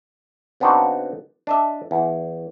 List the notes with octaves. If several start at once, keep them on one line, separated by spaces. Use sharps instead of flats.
C#3 B3 C4 D4 D#4 F#4
D4 D#5 E5
E2